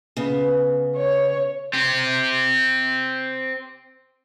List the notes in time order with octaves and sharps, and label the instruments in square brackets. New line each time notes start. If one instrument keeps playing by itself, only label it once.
[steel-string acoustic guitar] C#3 B3
[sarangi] C#5
[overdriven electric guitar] C4 G4